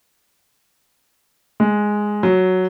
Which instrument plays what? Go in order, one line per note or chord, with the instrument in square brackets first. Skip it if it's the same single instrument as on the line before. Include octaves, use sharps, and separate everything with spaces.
[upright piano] G#3
F#3